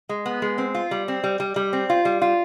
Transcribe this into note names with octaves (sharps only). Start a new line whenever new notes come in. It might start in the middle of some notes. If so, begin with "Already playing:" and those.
G#3
B3
G#3
C4
F4
G3
C4
G3
G3
G3
C4
F4
G3
F4